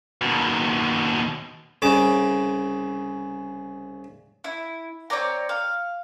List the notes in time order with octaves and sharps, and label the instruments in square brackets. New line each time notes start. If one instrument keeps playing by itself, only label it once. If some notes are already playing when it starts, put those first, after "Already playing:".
[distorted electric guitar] D#2 B2
[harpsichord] C2 C#3 D6
[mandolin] E4
C4 C#5 D5 A#5
F5